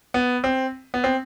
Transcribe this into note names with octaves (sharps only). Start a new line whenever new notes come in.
B3
C4
B3
C4